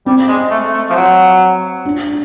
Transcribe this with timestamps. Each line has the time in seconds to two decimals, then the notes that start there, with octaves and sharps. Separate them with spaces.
0.06 G3 C4
0.28 G#3
0.50 A3
0.73 A3
0.90 F3
0.95 F#3
1.85 D4